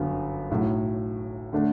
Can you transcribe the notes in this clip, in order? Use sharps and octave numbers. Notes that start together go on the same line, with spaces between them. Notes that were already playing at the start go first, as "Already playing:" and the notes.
Already playing: G1 F#2 D3 F#3 B3
B1 A2 F#3
D3 A3 D4